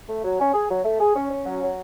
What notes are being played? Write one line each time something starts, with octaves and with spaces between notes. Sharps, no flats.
A3
F#3
C#4
G#4
F#3
A3
G#4
C#4
C#4
F#3
F#3